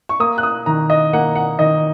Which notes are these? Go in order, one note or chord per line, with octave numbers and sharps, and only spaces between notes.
C#6
A#3 D#6
F#6
D#6
D#3 A#5
D#5
A#3 F#5
F#5
D#3 D#5